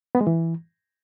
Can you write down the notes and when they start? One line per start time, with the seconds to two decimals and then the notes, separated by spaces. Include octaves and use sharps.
0.15 B3
0.21 G#3
0.27 E3